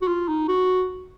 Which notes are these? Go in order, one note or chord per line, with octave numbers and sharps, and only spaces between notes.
F#4
F4
D#4
F#4